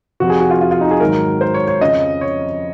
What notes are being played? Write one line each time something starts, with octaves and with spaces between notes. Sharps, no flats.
F2 C3 F3 F#4
G#4
F#4
F4
F4
F4
D#4
G#4
G#2 D#3 F#3 A#4
C5
C#5
C#5
F2 C#3 F3 D#5
C#5